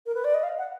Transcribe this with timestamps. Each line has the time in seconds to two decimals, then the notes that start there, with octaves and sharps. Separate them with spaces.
0.06 A#4
0.15 B4
0.24 D5
0.34 D#5
0.43 F5
0.58 F#5